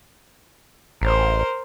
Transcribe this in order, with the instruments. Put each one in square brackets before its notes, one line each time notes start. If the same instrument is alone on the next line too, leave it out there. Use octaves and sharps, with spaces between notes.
[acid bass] A1 [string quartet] A#4 C5